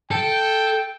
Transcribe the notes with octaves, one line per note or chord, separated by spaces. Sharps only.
A4 G5